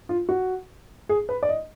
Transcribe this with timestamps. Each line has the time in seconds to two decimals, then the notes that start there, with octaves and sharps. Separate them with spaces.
0.09 F4
0.29 F#4
1.09 G#4
1.29 B4
1.43 D5
1.49 D#5